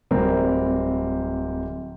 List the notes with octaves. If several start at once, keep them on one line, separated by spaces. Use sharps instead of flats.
D1 G3 C4 A#4